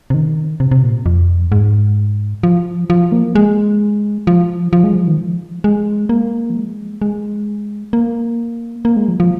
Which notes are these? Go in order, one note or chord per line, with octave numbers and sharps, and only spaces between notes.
C3
D#3
C3
C3
A#2
F2
G#2
F3
F3
A#3
G#3
F3
F3
G#3
F3
D#3
F3
G#3
A#3
F3
G#3
G#3
A#3
A#3
G#3
F3
F3